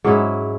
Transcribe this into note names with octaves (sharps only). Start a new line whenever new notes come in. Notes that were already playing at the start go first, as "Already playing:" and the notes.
G#2 F#3 C#4 E4